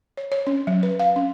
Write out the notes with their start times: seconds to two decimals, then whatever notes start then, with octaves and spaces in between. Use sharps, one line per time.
0.17 C#5
0.32 C#5
0.47 C#4
0.67 F#3
0.83 B4
0.99 F5
1.16 C#4